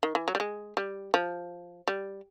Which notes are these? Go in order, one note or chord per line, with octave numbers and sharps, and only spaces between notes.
D#3
E3
F#3
G3
G#3
G3
F3
G3